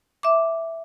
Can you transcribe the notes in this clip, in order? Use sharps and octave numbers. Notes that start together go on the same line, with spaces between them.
E5 D6